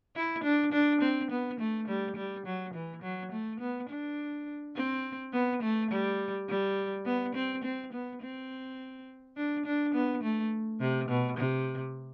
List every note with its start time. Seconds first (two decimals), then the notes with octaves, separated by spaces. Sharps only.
0.16 E4
0.44 D4
0.72 D4
1.01 C4
1.31 B3
1.60 A3
1.88 G3
2.16 G3
2.46 F#3
2.74 E3
3.02 F#3
3.32 A3
3.60 B3
3.89 D4
4.76 C4
5.33 B3
5.62 A3
5.90 G3
6.49 G3
7.05 B3
7.35 C4
7.64 C4
7.93 B3
8.22 C4
9.37 D4
9.66 D4
9.94 B3
10.23 A3
10.80 C3
11.09 B2
11.37 C3